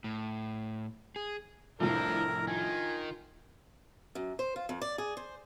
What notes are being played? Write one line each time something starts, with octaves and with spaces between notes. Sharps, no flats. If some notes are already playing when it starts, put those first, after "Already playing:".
A2
G#4
C2 F2 A2 F3 D4 E4 A#4
D#3 F4 G#5
F#2
C5
F4
F2
D5
G#4
C5